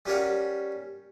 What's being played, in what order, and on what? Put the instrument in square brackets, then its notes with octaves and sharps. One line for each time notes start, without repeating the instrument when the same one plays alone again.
[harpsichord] G3 C#4 A#4 F#5